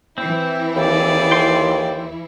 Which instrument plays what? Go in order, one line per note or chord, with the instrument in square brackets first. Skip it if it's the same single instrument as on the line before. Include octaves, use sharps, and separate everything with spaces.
[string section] E3 E4 [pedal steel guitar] C4
[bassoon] D#2 [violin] G#4 D5
[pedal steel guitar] G5 C6